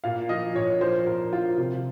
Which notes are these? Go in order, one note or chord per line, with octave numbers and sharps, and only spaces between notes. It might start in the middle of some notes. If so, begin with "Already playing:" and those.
A#2 F5
F3 D#5
A#2 C#5
F3 C5
A#2 A#4
F3 F4
C3 F4